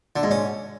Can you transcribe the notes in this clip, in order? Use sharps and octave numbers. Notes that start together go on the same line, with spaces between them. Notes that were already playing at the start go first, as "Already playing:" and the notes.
D3
G#2
C#4